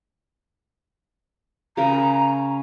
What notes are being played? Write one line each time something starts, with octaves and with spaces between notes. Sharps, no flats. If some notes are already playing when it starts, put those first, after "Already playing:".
C#3 A#4 A#5 B5